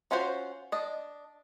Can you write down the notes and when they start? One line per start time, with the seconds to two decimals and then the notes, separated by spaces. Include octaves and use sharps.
0.11 C#4 F4 F#4 C5
0.72 D4 D#5